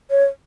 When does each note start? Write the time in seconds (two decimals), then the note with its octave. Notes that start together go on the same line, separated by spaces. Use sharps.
0.10 C#5